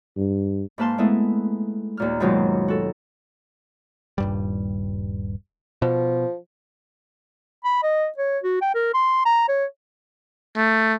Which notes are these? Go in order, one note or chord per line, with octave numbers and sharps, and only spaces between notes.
G2
G#2 A#3 B4 F5 A5 C6
G#3 A3 B3 E4
D#2 A#2 F6
G#2 B2 D#3 F#3 G#3 F4
F#4 A4
D#1 G2 G3
B2 F3
B5
D#5
C#5
F#4
G5
A#4
C6
A#5
C#5
A3